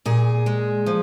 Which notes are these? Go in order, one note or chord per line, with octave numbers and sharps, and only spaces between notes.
A#2 G#4
G#3
F3